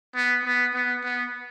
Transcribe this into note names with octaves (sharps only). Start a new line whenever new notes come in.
B3
B3
B3
B3